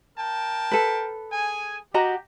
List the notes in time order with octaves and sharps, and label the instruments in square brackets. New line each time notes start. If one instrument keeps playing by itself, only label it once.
[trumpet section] A#4 G5 A5
[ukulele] A4 B4
[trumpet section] G#4 G#5
[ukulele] F#4 D#5 A#5 [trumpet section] G4